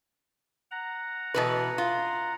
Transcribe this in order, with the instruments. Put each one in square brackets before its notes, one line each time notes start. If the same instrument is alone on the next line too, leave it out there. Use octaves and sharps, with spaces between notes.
[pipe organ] F#5 A#5
[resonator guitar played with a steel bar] B2 E3 B4
F4